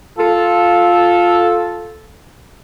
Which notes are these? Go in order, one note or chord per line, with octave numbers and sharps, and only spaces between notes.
F4 A4